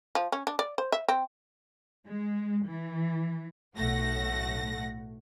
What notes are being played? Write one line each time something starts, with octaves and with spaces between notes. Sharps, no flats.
F3
C#4
D4
D5
C5
E5
C4
G#3
E3
B1 A2 A3 F#5 A#6